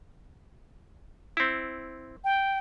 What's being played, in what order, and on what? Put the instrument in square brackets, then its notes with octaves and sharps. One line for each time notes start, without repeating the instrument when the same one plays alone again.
[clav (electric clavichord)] C4 E4
[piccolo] G5